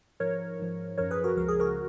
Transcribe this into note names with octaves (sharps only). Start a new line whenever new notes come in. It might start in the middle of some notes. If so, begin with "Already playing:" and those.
G#2 F3 A#4 C#5
G#2 F3
F#2 F3 A#4 C#5
G#4 B4
F#4 A#4
C#2 C#3 F3 A#4
G#4
F#4 A#4